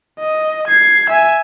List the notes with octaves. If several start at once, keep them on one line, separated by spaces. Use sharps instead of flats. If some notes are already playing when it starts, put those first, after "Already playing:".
D#5
G#6 C7
E5 G#5